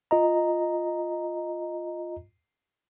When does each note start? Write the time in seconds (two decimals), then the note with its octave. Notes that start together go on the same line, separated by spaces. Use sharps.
0.11 F4 D#5 A#5